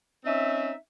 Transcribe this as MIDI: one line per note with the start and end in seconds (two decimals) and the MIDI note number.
0.25 0.73 60
0.25 0.73 61
0.25 0.73 63
0.25 0.73 76